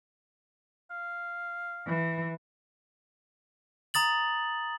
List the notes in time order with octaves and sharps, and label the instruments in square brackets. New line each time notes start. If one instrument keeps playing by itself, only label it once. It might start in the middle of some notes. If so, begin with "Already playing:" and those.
[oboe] F5
[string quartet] E3
[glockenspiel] A#5 D#6 A6 F#7